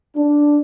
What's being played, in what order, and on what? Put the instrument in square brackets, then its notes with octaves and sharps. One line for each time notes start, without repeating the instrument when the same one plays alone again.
[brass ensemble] D4